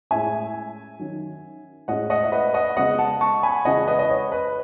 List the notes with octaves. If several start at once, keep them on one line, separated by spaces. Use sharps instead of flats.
A2 G#3 C#4 E5 G#5
D#3 F#3 C#4
A2 G#3 C#4 D#5 F#5
D#5 F#5
E5
B4 D#5
D#5 F#5
C#3 G#3 B3 D#5 F#5
F#5 A5
A5 C#6
G#5 B5
C#3 E3 G#3 D#5 F#5
B4 D#5
D#5
C#5
B4